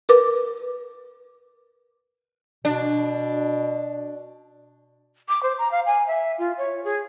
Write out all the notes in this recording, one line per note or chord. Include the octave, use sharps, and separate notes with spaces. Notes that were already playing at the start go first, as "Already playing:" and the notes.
A#4 B4 D6
B2 D4
D6
C5
A#5
F5
G#5
E5
F4
C#5
G#4